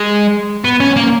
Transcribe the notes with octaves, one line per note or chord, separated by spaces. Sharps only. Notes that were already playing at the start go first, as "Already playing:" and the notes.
Already playing: G#3
B3
C#4
A#3